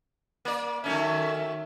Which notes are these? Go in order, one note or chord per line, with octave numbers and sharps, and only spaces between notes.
A#3 D5
D#3 F#3 A3 C#4 E5